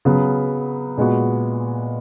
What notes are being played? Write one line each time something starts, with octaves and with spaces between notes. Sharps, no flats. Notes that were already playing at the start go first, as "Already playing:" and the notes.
C#3 F#3 B3
A#2 G#3 B3 F#4